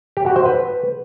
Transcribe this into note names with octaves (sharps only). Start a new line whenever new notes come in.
G4
F#4
C5
B4